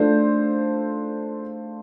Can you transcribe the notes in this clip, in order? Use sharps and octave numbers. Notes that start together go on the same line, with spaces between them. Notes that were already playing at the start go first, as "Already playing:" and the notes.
Already playing: A3 D4 F4 A4 C5